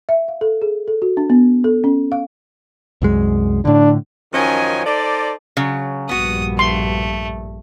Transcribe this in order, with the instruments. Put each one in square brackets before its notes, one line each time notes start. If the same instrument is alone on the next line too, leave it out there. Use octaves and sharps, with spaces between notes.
[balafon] E5
F5
A4
G#4
A4
F#4
D4
B3
A4
C#4
F5
[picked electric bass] C2 F#2 G#3
[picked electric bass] A2 D3 [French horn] D4
[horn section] F#2 D#3 F3 C#4 D#5 G#5
D#4 A4 C5 D5
[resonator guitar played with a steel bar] C#3 F#3
[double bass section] A#1 G2 [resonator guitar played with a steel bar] B3 F#4 [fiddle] D#6
[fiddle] A3 [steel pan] C6